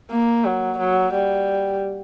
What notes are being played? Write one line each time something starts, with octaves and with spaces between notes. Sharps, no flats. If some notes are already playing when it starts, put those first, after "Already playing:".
A#3
F#3
F#3
G3